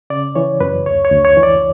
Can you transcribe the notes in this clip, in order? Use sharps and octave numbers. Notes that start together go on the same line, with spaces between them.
C#3 D5
E3 C#5
F#2 B4
D2 C#5
C#5
D2
C#5
E3
D5